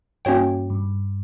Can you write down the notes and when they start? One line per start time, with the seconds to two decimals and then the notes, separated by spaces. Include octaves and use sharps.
0.25 G2 A#3 C#4 F#4 C#5 G5
0.70 G2